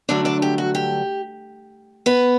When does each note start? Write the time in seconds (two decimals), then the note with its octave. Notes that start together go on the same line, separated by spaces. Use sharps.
0.09 G2 D3 F#3 A3 D4 D5
0.25 D4 D5
0.42 G4
0.58 F#4
0.75 G4
2.06 B3 B4